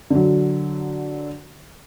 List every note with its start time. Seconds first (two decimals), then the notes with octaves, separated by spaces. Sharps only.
0.10 D3 F#3